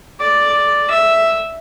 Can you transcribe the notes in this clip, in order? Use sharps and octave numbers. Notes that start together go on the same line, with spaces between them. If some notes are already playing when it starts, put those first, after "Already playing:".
D5
E5